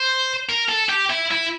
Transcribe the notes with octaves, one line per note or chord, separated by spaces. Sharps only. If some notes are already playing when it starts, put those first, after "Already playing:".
Already playing: C5
A#4
A4
G4
E4
E4